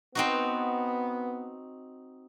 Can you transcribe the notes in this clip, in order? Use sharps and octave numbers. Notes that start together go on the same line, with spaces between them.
B3 C4 D#4 F#4